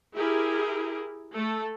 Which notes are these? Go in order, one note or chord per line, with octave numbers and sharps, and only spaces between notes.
E4 G4 G#4 A#4
A3 A4